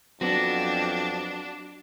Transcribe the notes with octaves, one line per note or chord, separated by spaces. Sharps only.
F2 F#3 B3 C4 D4 F#4